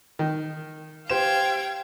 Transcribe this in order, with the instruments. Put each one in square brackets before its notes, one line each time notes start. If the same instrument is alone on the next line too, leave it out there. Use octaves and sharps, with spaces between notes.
[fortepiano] D#3
[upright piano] G4 C5 E7 [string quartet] F5 G5 G#6